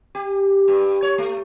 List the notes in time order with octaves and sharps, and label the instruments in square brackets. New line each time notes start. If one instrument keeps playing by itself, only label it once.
[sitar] G4
G2
C#5
A3